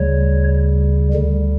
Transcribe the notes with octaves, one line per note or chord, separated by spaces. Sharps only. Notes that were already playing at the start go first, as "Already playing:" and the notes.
Already playing: D2 C#3 G3 C#5
D2 D3 G3